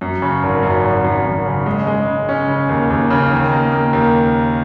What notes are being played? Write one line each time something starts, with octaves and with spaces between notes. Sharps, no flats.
F#2
C#3
G#1
F#2
G#1
F#2
G#1
C#3
G#3
G#3
C#3
C#4
C#3
D#2
D#2
C#3
D#3
A#3
A#3
D#2